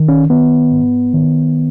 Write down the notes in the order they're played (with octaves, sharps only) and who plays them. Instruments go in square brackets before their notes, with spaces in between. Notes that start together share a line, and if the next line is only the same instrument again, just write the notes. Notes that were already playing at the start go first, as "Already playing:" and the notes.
Already playing: [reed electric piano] D#3
C#4
D#3 B3
G#2
D#3